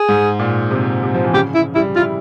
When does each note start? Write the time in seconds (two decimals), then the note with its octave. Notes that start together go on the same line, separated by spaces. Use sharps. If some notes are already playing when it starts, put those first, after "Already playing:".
Already playing: G#4
0.08 G#2
0.39 A#2
0.71 C3
1.03 C3
1.14 F3
1.24 E3
1.34 C#3 G4
1.55 E4
1.75 G3 E4
1.96 E4 F4